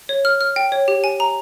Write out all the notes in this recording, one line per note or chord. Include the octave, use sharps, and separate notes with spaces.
C#5
F6
F6
G5
C#5
G4
G#5
A#5